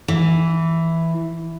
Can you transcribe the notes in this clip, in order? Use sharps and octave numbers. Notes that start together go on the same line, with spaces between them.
E3